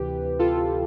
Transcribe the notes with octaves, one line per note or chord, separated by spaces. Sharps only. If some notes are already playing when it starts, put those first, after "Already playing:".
Already playing: D2 C3 E3 G4 B4
F4 A4